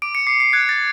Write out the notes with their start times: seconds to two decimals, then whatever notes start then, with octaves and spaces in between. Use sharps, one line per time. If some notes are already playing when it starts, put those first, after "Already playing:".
0.02 D6 D7
0.15 C#7
0.27 D6 C7
0.40 C7
0.53 F#6 G#6
0.69 A6